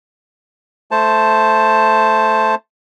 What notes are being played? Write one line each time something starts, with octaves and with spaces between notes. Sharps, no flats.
A3 C5 A5